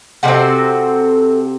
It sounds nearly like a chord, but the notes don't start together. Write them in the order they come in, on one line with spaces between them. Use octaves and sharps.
C3 G3 F#4 A4 C4